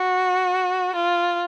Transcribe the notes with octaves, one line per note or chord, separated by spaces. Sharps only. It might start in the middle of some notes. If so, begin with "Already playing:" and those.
Already playing: F#4
F4